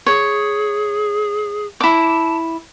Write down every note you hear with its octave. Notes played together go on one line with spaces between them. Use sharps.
G#4 C#5
E4 A5 D6